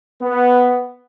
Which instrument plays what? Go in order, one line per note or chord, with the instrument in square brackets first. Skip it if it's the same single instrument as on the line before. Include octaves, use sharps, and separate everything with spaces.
[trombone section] B3